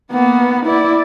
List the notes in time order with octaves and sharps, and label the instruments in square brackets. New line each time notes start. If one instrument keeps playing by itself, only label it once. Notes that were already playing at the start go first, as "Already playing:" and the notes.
[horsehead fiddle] A#3 B3
E4 D5